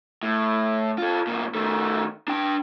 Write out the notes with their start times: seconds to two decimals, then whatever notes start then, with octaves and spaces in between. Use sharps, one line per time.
0.23 A2
0.98 F4 A4
1.27 C2 A#2
1.55 D#3 A3
2.28 D4 G5